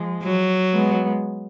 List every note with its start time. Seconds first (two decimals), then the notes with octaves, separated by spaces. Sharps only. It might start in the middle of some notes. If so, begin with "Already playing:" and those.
Already playing: F3 G#3
0.23 F#3
0.72 G#3 B3